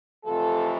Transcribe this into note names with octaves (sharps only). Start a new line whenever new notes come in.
F2 C3 E3 A3 F4 A4